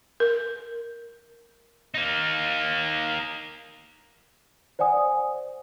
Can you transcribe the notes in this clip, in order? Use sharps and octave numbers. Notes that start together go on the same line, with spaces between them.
A#4
A#3 D#4
C5 D5 F#5 G#5 D#6